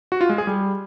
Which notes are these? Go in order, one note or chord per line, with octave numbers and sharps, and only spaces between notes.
F#4
F4
G#3
G#4
G3